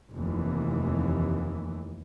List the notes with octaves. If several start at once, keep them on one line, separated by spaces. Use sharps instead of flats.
F1 D#2 E3